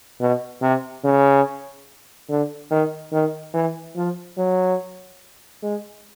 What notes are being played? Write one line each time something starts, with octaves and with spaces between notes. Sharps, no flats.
B2
C3
C#3
D3
D#3
D#3
E3
F3
F#3
G#3